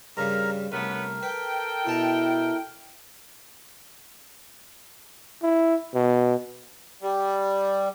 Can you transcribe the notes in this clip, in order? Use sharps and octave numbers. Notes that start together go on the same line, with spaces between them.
G2 C#3 G3 A#4 A#5
C2 A3 B3 C#4 A#4 B4
A4 B4 G5
B2 E4 A5 A#5
E4
B2
G3